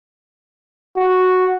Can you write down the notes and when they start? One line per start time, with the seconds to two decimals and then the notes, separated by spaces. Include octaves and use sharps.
0.97 F#4